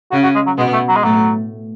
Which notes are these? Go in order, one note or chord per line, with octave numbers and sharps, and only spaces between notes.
C#3 C#4 F#4
F#4
G#3
F#3
B2 G#3 B3
A3
F#3
G#3
A2 F#3 A3